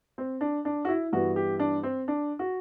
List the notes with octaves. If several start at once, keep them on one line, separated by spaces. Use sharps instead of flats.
C4
D4
D4
F#4
E4
G2 E3 B3 F#4
G4
D4
C4
D4
F#4